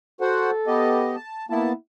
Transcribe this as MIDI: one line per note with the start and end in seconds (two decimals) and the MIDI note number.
0.21 0.51 66
0.21 1.17 69
0.21 0.51 72
0.21 0.51 78
0.67 1.16 59
0.67 1.16 67
0.67 1.16 75
1.16 1.46 81
1.50 1.72 58
1.50 1.72 59
1.50 1.74 64
1.50 1.72 81